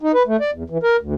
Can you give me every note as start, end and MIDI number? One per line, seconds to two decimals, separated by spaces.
0.01 0.12 63
0.14 0.23 71
0.27 0.37 57
0.40 0.51 74
0.53 0.63 40
0.70 0.78 52
0.83 0.97 70
1.01 1.14 38